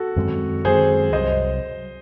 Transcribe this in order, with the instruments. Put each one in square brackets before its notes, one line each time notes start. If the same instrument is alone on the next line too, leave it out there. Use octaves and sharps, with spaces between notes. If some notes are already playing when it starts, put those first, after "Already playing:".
Already playing: [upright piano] F#4 A4
[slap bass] F#2 D#3 G#3 C4
[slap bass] F#2 D#3 G#3 C4 [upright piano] G#4 C5
[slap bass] C2 C3 F#3 [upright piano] C5 D#5